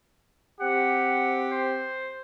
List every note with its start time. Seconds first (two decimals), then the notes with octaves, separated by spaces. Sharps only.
0.61 C4 G4 F#5
1.51 C5